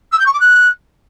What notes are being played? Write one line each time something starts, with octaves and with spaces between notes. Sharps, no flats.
E6
G6
C#6
D6
F#6